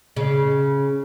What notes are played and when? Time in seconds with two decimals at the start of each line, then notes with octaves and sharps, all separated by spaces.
0.16 C#3